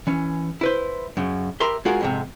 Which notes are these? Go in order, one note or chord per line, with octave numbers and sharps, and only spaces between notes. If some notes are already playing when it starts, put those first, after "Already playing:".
E3 C#4
E4 B4 C5
F#2 C#3
G4 A#4 E5 B5 C6
G#3 F4 F#4 G#4 A#4
F2 G#2 C3